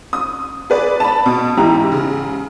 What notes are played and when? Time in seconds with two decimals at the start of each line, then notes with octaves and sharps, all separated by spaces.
0.13 D#6
0.70 G#4 B4 D5
1.00 A5 B5
1.26 B2
1.57 G#2 E3 G4 A#5
1.92 C#3